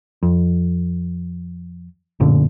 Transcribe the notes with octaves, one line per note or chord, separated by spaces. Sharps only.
F2
A1 F#2 A#2 D3